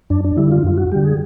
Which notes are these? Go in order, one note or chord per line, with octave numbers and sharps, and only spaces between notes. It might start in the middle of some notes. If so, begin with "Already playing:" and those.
F#2 D4
D4
D3 G3 E4
F4
F#2 F4
F#4
D3 G3 G4
G#4